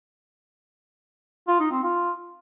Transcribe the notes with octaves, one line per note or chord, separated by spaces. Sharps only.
F4
D#4
C4
F4